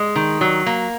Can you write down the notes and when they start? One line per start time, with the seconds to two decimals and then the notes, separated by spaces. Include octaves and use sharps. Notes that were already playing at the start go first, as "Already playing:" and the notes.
Already playing: G#3
0.16 D#3
0.41 F#3
0.66 A#3